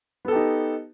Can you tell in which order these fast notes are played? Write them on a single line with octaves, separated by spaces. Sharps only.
B3 A4 G4 D#4